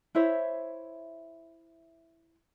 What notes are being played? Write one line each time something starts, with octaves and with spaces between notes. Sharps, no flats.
E4 C5 C#5 E5